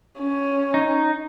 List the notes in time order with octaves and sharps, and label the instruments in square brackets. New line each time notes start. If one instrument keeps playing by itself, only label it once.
[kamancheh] C#4
[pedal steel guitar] D#4